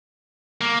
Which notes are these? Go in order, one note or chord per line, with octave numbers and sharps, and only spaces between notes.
A#3